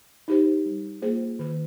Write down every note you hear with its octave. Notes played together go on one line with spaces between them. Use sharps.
D#4 G4 C5
G3
A#3 F4 G#4 C5
D#3